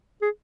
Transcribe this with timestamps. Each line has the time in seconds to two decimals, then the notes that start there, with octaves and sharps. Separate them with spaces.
0.22 G#4